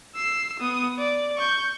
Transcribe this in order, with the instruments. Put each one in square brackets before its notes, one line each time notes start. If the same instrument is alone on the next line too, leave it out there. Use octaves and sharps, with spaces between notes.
[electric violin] E6 C7
B3 D#6
D5
C#6 G6